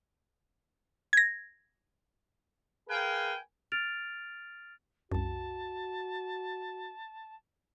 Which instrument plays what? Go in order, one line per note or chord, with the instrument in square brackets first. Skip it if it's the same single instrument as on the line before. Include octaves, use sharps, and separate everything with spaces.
[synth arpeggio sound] G#6 A#6
[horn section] G#4 A#4 B4 F5 G5 G#5
[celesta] F6 A6 D7 F7
[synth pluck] C2 F#2 [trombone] F#4 [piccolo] A5